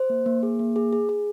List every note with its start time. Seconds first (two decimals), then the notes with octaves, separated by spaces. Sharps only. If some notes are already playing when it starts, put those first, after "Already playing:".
Already playing: C5
0.10 A#3
0.26 A#3
0.43 G#4
0.59 A#3
0.76 G#4
0.93 G#4
1.09 G#4